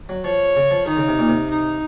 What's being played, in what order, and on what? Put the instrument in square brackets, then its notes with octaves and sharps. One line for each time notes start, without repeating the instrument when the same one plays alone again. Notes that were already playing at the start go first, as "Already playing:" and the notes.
[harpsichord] F#3
[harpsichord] F3 [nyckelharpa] C#5
[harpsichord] C#3
F3
[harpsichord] D#3 [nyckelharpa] D#4
[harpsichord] C#3
C3
A#2
C3
[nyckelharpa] D#4